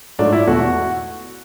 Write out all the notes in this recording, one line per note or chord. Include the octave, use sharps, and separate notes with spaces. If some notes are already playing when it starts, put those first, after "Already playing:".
G#2 F#3 A3 D4
E4
E2 B2 A3 F#4